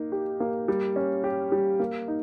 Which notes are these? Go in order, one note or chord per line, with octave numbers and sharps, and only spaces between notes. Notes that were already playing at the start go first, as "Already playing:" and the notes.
Already playing: A#3 D#4
G4
A#3
G3
C#4
G4
G3
A#3
D#4